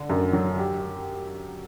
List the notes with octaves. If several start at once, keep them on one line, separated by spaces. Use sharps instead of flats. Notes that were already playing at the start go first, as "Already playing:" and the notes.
Already playing: D3
F#2
F#3
G4